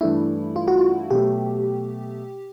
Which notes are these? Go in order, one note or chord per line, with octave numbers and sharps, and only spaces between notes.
G2 E3 A3 D4 E4
F4
F#4
F4
B2 F#3 A3 G4